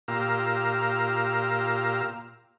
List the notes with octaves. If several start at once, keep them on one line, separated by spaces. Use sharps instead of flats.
A#2 F4 G4 F5 A#5 E6